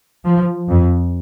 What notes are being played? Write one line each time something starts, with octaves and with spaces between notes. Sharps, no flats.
F3
F2